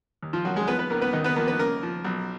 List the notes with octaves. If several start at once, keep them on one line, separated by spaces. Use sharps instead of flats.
D#2
F3 F4
D#3 F#3 F#4
G#3 G#4
F3 B3 B4
B3 B4
C#2 A#3 A#4
B3 B4
D#2 D#3 D#4
B3 B4
F3 A#3 A#4
B3 B4
C#3 A#3 A#4
F3
B1